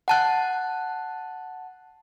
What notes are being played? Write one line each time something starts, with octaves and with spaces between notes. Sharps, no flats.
F#5 A5 F#6